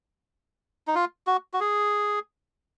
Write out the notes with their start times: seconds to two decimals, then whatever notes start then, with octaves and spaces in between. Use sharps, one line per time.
0.87 D#4
0.95 F4
1.27 F#4
1.53 F#4
1.60 G#4